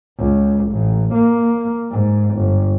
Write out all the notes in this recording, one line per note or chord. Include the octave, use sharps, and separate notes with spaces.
C#2
A1
A#3
G#2
G1